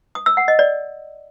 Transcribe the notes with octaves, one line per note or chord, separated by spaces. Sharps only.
D#6
E6
F#5
D#5
D5